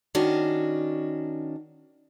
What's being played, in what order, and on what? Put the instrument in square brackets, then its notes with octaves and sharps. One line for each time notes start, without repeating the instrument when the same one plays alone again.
[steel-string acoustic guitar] D#3 C#4 D4 F#4